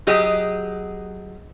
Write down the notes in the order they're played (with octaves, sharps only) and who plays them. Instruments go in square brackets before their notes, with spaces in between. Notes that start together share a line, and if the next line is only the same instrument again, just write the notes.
[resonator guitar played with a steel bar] F#3 G4 G#4 D#5